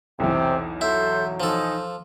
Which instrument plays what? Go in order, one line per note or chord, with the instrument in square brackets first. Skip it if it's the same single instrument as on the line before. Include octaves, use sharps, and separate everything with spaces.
[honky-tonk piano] B1 E2 [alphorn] C3 [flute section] C5 G5
[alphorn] F#3 [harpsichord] E4 [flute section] A4 C6 G6
[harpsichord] F3 A4 [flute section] D#4 G#5